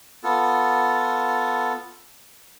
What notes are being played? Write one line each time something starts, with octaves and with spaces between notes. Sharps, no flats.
B3 F4 A4